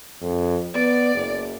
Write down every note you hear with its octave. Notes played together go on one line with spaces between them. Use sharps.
F2
B3 D5
F#1